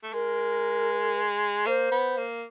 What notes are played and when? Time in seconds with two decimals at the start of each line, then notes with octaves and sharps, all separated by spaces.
0.03 A3
0.13 G#3 A#4
1.66 A#3 C5
1.92 B3
2.17 A#3